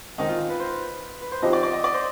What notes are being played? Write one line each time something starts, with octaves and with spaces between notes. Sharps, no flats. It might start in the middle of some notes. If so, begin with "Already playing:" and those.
D#3 G#3 C4 D#4
F4
B4
C5
B4
B4
C5
F3 C4 D#4 G4 C5 D#5
D5
D5
D#5
D5
C5